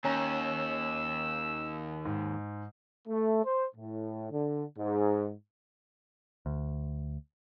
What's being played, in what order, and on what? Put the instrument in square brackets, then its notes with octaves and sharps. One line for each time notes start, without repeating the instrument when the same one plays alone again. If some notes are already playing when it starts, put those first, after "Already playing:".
[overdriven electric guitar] D#2 [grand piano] C#4 G#5 A#5 [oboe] E6
[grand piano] G#2
[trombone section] A3
C5
A2
D3
G#2
[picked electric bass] D2